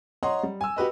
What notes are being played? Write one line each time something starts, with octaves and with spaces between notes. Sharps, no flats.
C#5 D#5 F#5 A#5 C6
G3
G#5 E6
F#4 G4 B4 D#5